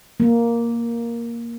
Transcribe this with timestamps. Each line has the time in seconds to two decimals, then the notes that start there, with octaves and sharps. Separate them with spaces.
0.20 A#3